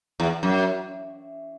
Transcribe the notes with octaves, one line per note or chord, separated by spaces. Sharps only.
E2
F#2